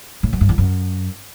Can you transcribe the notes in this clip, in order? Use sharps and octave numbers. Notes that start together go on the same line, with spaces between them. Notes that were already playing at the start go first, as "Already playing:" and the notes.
A2
F#2
G2
E2
F#2